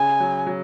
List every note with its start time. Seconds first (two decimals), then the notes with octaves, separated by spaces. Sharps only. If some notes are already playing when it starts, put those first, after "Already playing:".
Already playing: C#3 G#5
0.20 F#3
0.46 F#3